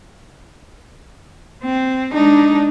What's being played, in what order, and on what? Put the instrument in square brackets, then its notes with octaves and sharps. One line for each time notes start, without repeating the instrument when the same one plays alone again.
[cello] C4
[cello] G#3 D#4 [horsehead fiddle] D4